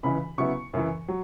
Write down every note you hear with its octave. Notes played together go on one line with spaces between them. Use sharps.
C#2 C#3 E3 B5
C#3 F#3 B3 E4 C#6
F#2 C#3 E3
F#3